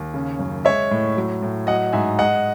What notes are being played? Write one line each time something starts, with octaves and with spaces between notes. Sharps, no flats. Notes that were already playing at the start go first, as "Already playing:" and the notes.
Already playing: D#2
C#3
F#2
G#3 C#5 E5
A2
F#3
A2
F#3 D#5 F#5
G#2 E5 G#5
G#3 D#5 F#5